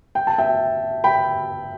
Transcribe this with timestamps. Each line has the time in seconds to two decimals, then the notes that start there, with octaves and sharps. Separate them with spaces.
0.15 G5
0.27 A5
0.38 E5 G5
1.04 G5 B5